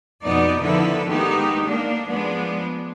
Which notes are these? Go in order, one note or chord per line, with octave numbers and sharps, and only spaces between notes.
F2 B2 B3 D#4 D5
D3 D#3 F3 E4 A4 B4
D#3 G#3 B3 D#4 G4
A#3 D4
F3 G#3 B3 D4